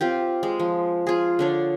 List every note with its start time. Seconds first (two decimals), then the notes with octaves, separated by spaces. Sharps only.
0.01 C4 F4 G4
0.43 G#3
0.60 F3
1.07 F4 G#4
1.39 D3 D4 C#5